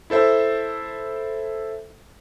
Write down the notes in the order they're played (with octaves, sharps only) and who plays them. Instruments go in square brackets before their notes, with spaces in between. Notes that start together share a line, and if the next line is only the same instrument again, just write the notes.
[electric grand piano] E4 A4 C5 E5